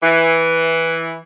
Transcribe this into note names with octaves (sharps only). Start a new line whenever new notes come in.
E3